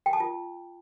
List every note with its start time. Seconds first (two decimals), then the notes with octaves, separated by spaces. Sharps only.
0.06 G5
0.13 A5
0.20 F4